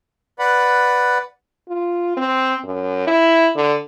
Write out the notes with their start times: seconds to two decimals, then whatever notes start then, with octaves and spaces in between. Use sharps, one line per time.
0.39 B4 D5 F#5 B5
1.68 F4
2.17 C4
2.64 F#2
3.08 E4
3.55 D3